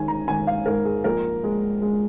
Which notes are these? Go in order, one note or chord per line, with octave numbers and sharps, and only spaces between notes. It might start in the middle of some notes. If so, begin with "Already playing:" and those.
Already playing: D#3 G#3 G#5
A#5
D#3 G#5
F5
G#2 A#4
G#4
A#1 A#4
G#3
G#3